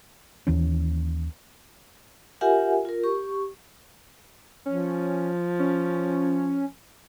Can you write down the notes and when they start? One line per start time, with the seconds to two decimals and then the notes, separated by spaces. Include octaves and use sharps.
0.47 D#2 E3 C#4
2.41 F4 G4 A#4 E5 F#5 G#5
2.85 F4 A#4
3.03 G4 C#6
4.66 F3 C#4
5.59 C#4